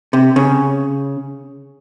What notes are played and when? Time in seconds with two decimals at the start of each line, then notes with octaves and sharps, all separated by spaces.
0.13 C3
0.36 C#3